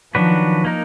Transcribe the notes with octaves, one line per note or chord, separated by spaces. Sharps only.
D#3 F3 F#3 D4 F#4 B4
A#3 D#4 A#4